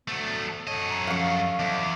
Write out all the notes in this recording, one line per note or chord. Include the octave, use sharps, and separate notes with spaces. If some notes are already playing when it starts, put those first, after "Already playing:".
D2 F#3 A3 B3
F#2 A4 C#5 D#5
A#5
F3 F#3 C#4 F5 C#6
E2 D#5 E5 D6